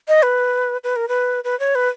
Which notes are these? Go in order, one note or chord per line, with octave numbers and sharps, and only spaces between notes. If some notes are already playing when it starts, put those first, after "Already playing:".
D#5
B4
B4
A#4
B4
B4
C#5
B4